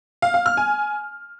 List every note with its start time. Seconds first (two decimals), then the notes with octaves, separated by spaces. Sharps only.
0.22 F5
0.34 F5
0.46 F6
0.57 G#5